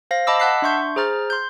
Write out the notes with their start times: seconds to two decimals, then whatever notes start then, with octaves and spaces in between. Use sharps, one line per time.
0.11 C5 F5 A#6
0.27 D#5 A5 B5 D6 E6
0.40 F#5 A5 E6 F#6 B6 C7
0.62 D4 E5 C6 C#6 G6
0.96 G#4 C5 A#5 F6 A6
1.30 C6 G6